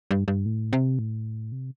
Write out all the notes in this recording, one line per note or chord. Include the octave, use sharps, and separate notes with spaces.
G2
G2
A2
C3
A2
C3